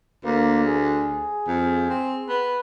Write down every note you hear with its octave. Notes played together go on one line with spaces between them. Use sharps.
D2 A#3
G#4
F2
C4
B3